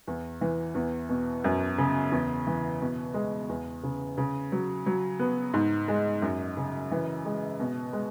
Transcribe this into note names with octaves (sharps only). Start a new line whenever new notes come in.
E2
E3
E2
B2
F#2
C#3
E2
E3
B2
G#3
E2
C#3
C#3
F#3
F#3
B3
G#2
G#3
F#2
C#3
E3
G#3
B2
G#3